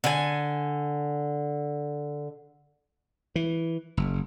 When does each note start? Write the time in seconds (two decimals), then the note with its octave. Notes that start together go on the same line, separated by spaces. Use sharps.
0.04 D3 G#5
3.36 E3
3.97 F#1